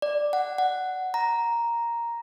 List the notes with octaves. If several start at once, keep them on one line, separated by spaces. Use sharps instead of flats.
D5
F#5
F#5
A#5